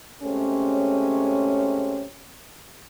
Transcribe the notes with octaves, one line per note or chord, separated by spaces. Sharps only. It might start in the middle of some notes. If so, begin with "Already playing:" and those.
C3 G#3 A3 C#4